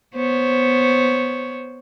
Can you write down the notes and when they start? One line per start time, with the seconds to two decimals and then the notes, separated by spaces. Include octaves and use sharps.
0.15 B3 C5 C#5